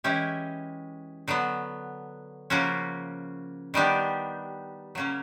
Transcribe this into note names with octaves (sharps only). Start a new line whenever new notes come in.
E3 G#3 C#4 E4 G4
D3 F#3 B3
C#3 F3 A#3 C#4 F#4
D#3 G3 B3 D4 G4
C#3 F#3 A#3 C#4